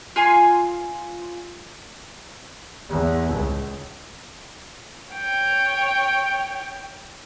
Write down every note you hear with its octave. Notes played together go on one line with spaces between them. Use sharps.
F4 G#5 C6
E2
C#2
C#5 G5